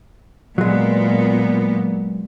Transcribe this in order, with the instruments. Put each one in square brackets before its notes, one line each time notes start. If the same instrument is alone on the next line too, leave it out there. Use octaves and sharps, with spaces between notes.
[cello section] A#2 B3 [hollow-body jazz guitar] F#3 G#3